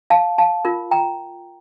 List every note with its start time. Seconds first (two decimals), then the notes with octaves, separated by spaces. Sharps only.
0.10 F5 A5
0.38 F5 A5
0.65 F4 A#4
0.91 G5 A#5